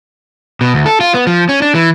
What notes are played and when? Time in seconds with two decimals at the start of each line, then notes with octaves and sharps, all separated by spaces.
0.61 B2
0.74 D2
0.86 A4
1.01 F4
1.14 B3
1.27 F3
1.49 C#4
1.62 D4
1.75 E3